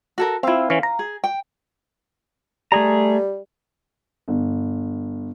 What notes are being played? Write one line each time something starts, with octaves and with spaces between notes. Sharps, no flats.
F#4 A4 A#4
C4 E4 F4 F5
E3 C#4
A#5
G#4
G5
G3 A3 G#4 A#5
G1